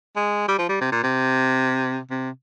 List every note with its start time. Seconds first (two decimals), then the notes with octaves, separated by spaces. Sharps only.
0.16 G#3
0.49 G3
0.59 F3
0.69 G3
0.81 C3
0.92 A#2
1.03 C3
2.10 C3